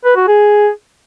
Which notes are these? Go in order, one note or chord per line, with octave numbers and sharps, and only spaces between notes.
B4
F#4
G#4